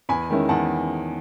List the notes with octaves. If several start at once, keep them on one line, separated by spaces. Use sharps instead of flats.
E2 G#5 B5
D#3 G#3 C#4 E4
E2 F#5 A5